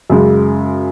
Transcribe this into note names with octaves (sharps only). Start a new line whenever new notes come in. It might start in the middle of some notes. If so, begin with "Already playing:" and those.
F#2 C#3 G#3